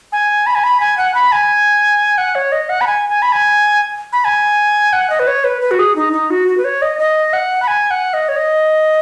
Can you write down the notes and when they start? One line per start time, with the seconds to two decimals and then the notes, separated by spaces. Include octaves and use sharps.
0.12 G#5
0.46 B5
0.55 G#5
0.64 B5
0.80 G#5
0.98 F#5
1.15 B5
1.32 G#5
2.18 F#5
2.35 C#5
2.52 D#5
2.69 F#5
2.81 B5
2.87 G#5
3.09 G#5
3.22 B5
3.32 G#5
4.13 B5
4.25 G#5
4.93 F#5
5.10 D#5
5.20 B4
5.27 C#5
5.44 B4
5.61 B4
5.71 F#4
5.79 G#4
5.96 D#4
6.13 D#4
6.30 F#4
6.48 F#4
6.57 B4
6.65 C#5
6.82 D#5
6.99 D#5
7.33 F#5
7.62 B5
7.68 G#5
7.91 F#5
8.14 D#5
8.29 C#5
8.36 D#5